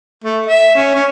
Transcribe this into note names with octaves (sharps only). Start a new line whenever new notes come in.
A3
E5
C#4
C#4